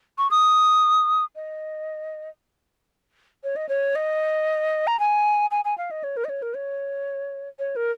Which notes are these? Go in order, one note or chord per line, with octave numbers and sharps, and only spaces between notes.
C#6
D#6
D#5
C#5
D#5
C#5
D#5
A#5
G#5
G#5
G#5
F5
D#5
C#5
A#4
D#5
C#5
A#4
C#5
C#5
A#4